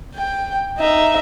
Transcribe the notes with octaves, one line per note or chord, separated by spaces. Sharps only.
G5
D#4 E5